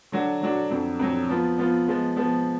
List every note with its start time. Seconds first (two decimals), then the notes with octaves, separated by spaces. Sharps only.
0.12 D3 F#3 D4 F#4
0.41 D3 F#3 D4 F#4
0.70 F2 D3 F#3
0.99 F2 D3 F#3
1.29 F3 B3 F4
1.58 F3 B3 F4
1.88 F3 G#3 B3
2.16 F3 G#3 B3